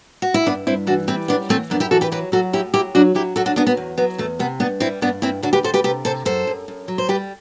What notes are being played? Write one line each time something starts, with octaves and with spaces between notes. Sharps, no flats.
F#4
E4
G2 B3 D4
G2 C4 E4
E3 D4 F#4
G3 C4 E4
F#2 B3 D4
E3 A3 C4
F#2 B3 D4
E4 G4
E3 F#4 A4
G4 B4
F#3 G4 B4
F#3 F#4 A4
A2 E4 G4
F#3 E4 G4
F#3 D4 F#4
F#3 E4 G4
F#3 F#4 A4
D4 F#4
F#3 B3 D4
B3
E2
F#3 B3
E2 A3
C3 B3
G2 B3 D4
G3 C4 E4
G2 B3 D4
G2 C4 E4
D2 D4 F#4
G4 B4
D2 A4 C5
G4 B4
C3 G4 B4
C3 A4 C5
F#2 A4 C5
F#2
F#2
F#3
C5
G3 G4 B4